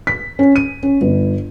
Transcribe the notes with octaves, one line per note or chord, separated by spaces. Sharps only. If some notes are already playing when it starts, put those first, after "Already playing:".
B6
C#4
D#7
C#4
G1